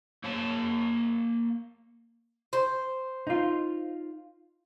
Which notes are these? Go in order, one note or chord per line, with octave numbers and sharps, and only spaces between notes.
A#3 C#5 F5 A5
C5
D#4 F4